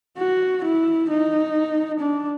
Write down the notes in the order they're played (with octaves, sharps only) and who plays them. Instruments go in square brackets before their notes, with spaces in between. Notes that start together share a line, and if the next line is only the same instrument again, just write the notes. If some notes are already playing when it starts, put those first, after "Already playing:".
[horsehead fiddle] F#4
E4
D#4
D4